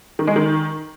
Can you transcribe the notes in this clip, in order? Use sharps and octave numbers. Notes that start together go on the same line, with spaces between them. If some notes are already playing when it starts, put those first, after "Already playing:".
D#3
G#3
D#3